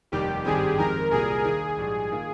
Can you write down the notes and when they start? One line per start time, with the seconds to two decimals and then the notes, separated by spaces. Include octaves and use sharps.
0.12 F1 D#2 D#3 G3 G4
0.45 G#1 G2 D#3 G3 C4 G#4
0.78 F2 D#3 G#3 C4 A#4
1.11 C2 A#2 G3 G#4
1.44 D#2 D#3 A#3 G#4
1.77 A#1 G#2 G3
2.11 D#3 A#3 F4